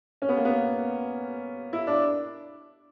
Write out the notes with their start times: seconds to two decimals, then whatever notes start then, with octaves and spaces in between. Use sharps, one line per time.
0.22 C#4
0.29 B3
0.37 A#3
0.45 B3
1.73 E4
1.87 D4